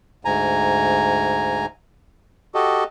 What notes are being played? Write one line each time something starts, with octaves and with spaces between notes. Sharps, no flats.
D2 G#2 G#5 A#5
F#4 G4 A4 D#5